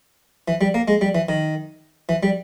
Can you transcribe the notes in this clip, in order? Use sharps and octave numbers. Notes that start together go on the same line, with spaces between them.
E3
G3
A#3
G#3
G3
E3
D#3
E3
G3